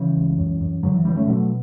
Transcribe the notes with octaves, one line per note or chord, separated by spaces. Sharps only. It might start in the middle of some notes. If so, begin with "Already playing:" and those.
Already playing: C#3 E3 G3
C#2
F#2
F#2
F#2 D3 F#3
E3
D3 E3 G3
A3 C#4
B2 F#3 A3